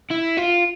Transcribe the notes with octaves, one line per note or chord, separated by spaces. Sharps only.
E4
F4